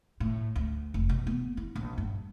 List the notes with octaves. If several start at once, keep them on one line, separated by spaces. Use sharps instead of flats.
A2
D2
F1
B2
B3
E4
A#1
G2